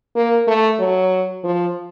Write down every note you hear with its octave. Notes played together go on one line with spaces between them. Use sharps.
A#3
A3
F#3
F3